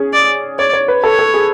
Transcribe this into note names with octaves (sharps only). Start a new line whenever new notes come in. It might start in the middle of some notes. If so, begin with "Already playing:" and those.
Already playing: C#4 G#4
D5
C#5 D5
C#5
B4
A4 C#5
A4
G#4